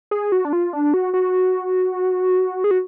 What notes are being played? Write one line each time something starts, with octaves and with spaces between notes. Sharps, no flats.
G#4
F#4
D4
F4
D4
F#4
F#4
G#4
F#4